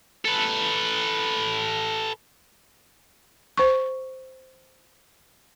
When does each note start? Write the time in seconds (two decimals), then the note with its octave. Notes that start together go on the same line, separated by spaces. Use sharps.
0.25 A4 B4
3.57 C5 C#6